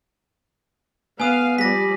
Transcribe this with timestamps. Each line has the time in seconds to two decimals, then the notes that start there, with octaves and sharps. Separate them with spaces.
1.20 B3 F5 G#5 D#6 D#7
1.58 F3 G3 D5 A#6 B6